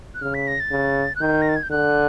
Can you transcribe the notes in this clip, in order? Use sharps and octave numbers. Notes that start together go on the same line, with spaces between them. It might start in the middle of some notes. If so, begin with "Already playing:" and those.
F#6
C#3 F6
B6
A#6
A6
C#3
F#6
D#3 G6
A#6
A6
G#6
G6
D3 F#6